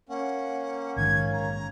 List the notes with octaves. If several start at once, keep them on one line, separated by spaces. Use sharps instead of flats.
A#3 C#4 F#5
A#1 G#2 D#3 G#6
A#5